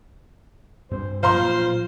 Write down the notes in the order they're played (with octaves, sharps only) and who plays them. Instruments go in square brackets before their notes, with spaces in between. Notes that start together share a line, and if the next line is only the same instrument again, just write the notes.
[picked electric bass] G2 C4 [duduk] C5
[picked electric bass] A#2 F3 F#3 [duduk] F4 [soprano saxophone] C5 [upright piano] F5 A#5 C6